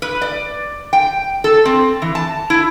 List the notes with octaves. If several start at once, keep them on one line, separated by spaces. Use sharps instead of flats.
B4
D5
G5
A4
C4
E3
A5
E4